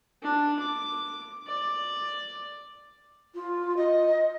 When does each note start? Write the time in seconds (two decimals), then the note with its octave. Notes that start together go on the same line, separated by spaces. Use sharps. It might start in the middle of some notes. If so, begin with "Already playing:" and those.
0.23 D4
0.59 D6
1.48 D5
3.34 F4
3.76 D#5